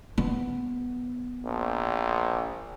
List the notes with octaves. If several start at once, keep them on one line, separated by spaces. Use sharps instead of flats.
B3
A#1